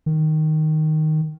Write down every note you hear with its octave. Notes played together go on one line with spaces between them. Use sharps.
D#3